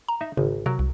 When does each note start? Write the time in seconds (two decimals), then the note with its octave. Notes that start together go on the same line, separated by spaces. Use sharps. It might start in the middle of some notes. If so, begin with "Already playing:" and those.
0.09 A#5
0.21 D#4 E5
0.37 G#1 C#3
0.66 C3 F#3 A#4
0.79 C2